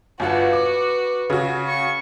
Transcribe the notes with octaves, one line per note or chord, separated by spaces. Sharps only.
G1 F4 F#4 B4 F#5
D6
C#3 F#4
C#4 C#6